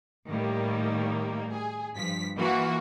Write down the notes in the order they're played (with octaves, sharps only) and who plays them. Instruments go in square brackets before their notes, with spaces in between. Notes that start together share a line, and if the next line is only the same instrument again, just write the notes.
[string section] A2 D#3 G3 A#3
G#4
G2 F3 B6
E3 A#3 F4 F#4